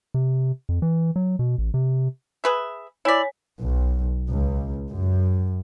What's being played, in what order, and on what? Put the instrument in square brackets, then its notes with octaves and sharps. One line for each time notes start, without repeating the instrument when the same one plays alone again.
[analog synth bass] C3
F2
E3
F#3
B2
A1
C3
[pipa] G#4 B4 E5
[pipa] E4 D5 [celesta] C#5 G#5 B6
[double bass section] B1
C#2
F#2